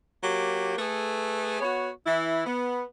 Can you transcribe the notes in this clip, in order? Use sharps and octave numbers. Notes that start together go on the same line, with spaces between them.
F#3 A#3 G4
A3 G#4 A4 B4
B3 F#4 C#5
E3 E4
B3